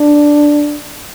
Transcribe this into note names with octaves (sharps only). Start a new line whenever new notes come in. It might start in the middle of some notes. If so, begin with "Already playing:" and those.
Already playing: D4